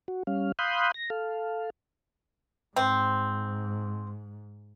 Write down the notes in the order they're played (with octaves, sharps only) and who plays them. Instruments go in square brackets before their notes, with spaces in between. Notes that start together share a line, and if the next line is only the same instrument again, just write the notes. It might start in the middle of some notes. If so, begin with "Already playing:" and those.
[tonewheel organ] F#4
G3 C#4 F5
F5 B5 C6 D#6 F#6 G6
A#6
A4 F5
[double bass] G#2 [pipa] C4